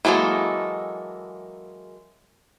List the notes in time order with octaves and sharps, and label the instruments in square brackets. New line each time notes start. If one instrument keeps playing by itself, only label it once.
[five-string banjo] E3 F#3 G#3 A#3 A4